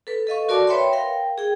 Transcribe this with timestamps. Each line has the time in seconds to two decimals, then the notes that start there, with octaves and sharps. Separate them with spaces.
0.07 A4 B4
0.27 A4 D#5 F5 C#6
0.49 F#4 A#4 D5 F5 A5 D6
0.67 B4 C#5 E5 G5 B5 C6
0.93 A#4 F5 G5
1.38 G#4 G5